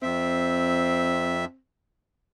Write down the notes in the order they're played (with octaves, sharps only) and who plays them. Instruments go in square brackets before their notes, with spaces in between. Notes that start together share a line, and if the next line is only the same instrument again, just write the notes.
[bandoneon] F2 E5 [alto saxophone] C4